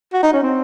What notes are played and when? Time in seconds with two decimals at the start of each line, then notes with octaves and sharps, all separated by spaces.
0.13 F#4
0.23 D#4
0.33 C#4
0.43 C4